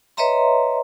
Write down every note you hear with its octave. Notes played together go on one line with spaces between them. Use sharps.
B4 C#5 D#5 E5 A#5 C6